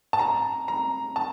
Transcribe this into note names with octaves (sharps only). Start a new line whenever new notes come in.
A5
A#5
A#5
A5